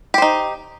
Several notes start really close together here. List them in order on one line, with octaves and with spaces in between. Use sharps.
G4 C5 D#4